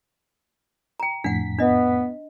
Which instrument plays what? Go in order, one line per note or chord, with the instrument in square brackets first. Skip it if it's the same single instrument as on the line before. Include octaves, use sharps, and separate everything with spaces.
[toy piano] G5 A#5
[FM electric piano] F2 A2 B6 [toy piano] D4 F#5
[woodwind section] B3 [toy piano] D4 D#5